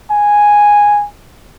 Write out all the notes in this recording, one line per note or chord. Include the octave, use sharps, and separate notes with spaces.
G#5